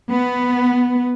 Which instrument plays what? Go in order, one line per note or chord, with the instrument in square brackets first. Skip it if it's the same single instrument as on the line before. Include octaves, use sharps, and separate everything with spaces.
[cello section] B3